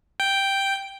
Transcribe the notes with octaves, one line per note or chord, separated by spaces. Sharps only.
G5